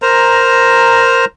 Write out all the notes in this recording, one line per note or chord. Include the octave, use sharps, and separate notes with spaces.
A#4 C5 A#5